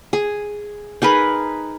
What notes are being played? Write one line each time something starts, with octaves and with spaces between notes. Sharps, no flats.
G#4
D#4 G#4 A#4 B4